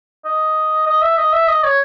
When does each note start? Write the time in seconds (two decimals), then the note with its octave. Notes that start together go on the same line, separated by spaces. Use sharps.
0.25 D#5
0.86 D#5
1.02 E5
1.17 D#5
1.33 E5
1.48 D#5
1.63 C#5